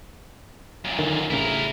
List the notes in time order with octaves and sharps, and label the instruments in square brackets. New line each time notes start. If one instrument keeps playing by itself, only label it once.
[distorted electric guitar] F#2 A#2
[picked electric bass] D3 D#3
[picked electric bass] A1 C#3 [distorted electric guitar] E4 A#4